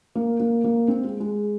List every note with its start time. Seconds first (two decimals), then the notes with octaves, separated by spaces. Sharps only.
0.15 A#3
0.40 A#3
0.64 A#3
0.88 C4
1.04 G#3
1.20 G#3